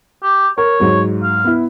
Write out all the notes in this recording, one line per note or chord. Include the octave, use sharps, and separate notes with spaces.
G4
A#4 C#5
G#2 F#3
F5
B3 E4